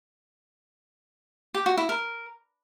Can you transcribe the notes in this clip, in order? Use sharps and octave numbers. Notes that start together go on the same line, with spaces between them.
G4
F#4
E4
A#4